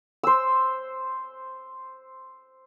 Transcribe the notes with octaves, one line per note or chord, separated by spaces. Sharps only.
C5 E6